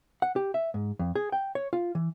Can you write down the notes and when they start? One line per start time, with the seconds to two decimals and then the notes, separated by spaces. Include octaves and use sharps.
0.22 F#5
0.36 G4
0.54 E5
0.74 G#2
0.99 F2
1.16 G#4
1.32 G5
1.55 C#5
1.73 F4
1.95 E3